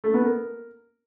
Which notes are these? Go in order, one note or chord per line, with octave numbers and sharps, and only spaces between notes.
A3
B3
A#4